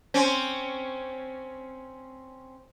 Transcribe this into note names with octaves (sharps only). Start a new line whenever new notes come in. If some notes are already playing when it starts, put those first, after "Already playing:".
C4 C#4